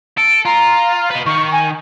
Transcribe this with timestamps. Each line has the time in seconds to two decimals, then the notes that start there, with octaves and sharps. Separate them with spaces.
0.18 A4 D7
0.45 F4 A#5
1.11 B4 D#5
1.26 D#3 C#6
1.52 G#5